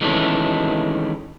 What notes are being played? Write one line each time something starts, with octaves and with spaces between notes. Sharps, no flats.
D#3 E3 G#3 A3 C#4 D4